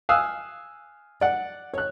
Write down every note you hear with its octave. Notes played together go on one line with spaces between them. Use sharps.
F5 G#5 D#6 E6 F#6
D5 F#5
C#5 F#6